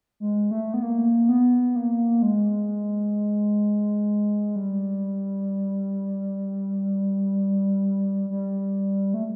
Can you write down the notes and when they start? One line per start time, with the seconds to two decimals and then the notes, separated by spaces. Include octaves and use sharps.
0.20 G#3
0.51 A3
0.74 B3
0.83 A#3
1.29 B3
1.76 A#3
2.22 G#3
4.56 G3
8.30 G3
9.14 A3